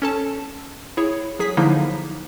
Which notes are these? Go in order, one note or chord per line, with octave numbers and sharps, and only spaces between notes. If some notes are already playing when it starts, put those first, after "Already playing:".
C#4 A4 A5
E4 G#4 C#5
F#3 G#4 B6
D3 F3 F#3 A#3 D#4 E4